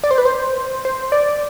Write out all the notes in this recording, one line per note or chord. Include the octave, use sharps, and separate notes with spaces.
D5
C5
B4
C5
C5
D5